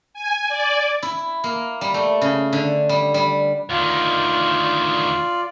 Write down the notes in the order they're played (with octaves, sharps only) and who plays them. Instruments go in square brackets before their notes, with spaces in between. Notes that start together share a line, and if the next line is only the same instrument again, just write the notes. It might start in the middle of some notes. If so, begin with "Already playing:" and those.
[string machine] G#5
D5
[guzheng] E4
A#3
G3
A3
C#3
D3
G3
G3
[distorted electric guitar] D2 D#3 [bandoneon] F4 D5